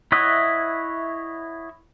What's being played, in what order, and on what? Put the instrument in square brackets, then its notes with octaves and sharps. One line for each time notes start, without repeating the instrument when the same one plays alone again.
[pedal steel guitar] E4 C#5 D#5 E5 F#5